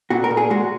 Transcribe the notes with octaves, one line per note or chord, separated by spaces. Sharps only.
A#2 F#4
A#4
A#2
G#4
G#3 F#4